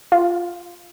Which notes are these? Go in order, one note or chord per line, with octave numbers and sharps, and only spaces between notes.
F4